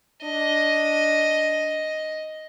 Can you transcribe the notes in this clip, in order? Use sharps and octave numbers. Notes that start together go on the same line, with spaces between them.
D4 D#5